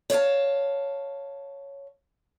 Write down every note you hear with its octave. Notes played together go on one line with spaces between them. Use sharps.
C#5 D5 E5 F5 A5